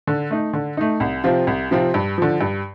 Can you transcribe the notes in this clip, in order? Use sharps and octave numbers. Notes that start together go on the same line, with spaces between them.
D3
A3 D#4
D3
A3 D#4
C2
C3 F3 C4 F4
C2
C3 F3 C4 F4
G2
D3 F3
G2